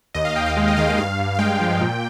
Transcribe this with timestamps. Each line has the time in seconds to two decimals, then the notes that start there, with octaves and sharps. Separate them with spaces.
0.14 D#2 D#5
0.25 F5
0.36 D#2 G5
0.41 D#5
0.46 F5
0.57 G#3
0.67 D#5
0.77 D#3 F5
0.87 F5
0.97 G2 F5
1.19 G2
1.35 F5
1.39 G#3 G5
1.60 F3
1.81 A#2